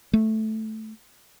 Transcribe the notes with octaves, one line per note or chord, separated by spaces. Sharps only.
A3